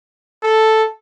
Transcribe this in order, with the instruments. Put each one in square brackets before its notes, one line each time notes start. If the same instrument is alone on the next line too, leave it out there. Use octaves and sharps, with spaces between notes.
[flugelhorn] A4